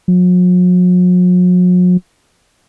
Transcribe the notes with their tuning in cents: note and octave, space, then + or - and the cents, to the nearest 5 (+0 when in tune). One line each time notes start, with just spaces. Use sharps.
F#3 -45